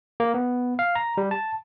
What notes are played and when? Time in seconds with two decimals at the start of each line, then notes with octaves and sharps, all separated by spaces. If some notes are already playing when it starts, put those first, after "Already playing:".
0.20 A#3
0.34 B3
0.79 F5
0.95 A#5
1.17 G3
1.31 A5